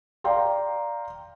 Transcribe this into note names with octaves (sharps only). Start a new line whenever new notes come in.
D5 F5 G5 A#5 C6